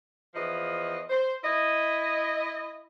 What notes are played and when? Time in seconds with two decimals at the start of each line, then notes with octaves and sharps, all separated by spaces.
0.35 E2 E3 F3 F4 D#5
1.10 C5
1.44 E4 D#5